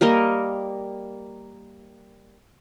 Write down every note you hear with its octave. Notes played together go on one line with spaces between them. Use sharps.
G3 A#3 A#4 D#5